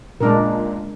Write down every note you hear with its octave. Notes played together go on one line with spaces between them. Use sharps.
A#2 G#3 D4 A#4